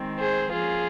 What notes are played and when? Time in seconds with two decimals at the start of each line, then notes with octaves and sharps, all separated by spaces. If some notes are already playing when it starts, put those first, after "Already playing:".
Already playing: D#3 G#3 C4
0.20 G#4 C5
0.51 F3 A#3 C#4 F4 G#4